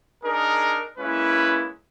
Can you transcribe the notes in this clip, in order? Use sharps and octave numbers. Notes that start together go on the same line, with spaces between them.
D4 D#4 G#4 A#4
G#3 A#3 C#4 E4 B4